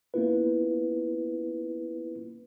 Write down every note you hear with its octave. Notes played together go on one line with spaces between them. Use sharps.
A#3 B3 C#4 E4 F4 B4